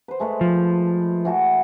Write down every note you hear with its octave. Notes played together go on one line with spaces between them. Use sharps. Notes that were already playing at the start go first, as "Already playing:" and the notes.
B4 C5
G#3 A3 B4
F3
E3 F#4 A5